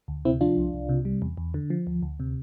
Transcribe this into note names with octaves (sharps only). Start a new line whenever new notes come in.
D2
C3 C4 E4
F3 D4 F4
C2
C2
C3
G3
E2
E2
D3
F3
D2
D2
C3